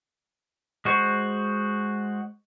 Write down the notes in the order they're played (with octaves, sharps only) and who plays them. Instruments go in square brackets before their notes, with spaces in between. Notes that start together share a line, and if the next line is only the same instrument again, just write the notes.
[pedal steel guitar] G#3 F#4 C5 C#6